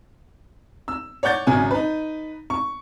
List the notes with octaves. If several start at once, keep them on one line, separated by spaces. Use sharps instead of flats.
E6
C#5 D5 F#5 G6 A6
G#1 F#2 C#3 G#5
D#4 B4
C#6